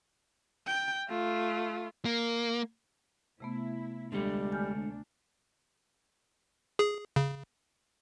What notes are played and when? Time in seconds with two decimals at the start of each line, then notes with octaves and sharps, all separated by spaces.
0.67 G5
1.09 A3 F4
2.05 A#3
3.40 C3 A3 B3 E4
4.12 D2 D3 G3 G#3 D4 A4
4.52 G#5 F6 G6
6.79 G#4
7.16 C#3